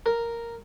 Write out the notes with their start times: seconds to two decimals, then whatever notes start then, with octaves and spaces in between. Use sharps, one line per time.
0.06 A#4